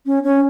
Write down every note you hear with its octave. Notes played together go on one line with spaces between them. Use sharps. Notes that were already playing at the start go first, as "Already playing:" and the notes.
C#4
C#4